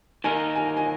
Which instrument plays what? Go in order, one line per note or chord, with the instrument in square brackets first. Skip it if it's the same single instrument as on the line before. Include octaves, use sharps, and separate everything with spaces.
[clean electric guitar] D#3 A#3 D#4 A#4 [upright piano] G#5
[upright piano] G#5
G#5